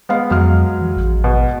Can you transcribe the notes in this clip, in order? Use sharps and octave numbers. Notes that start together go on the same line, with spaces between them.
G#3 B3 F5
F2 F#3 G#3 F6
E3
A1
B2